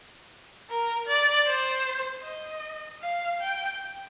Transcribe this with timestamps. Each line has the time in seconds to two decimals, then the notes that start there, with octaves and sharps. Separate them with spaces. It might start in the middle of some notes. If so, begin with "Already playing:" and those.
0.70 A#4
1.07 D5
1.47 C5
2.24 D#5
3.02 F5
3.41 G5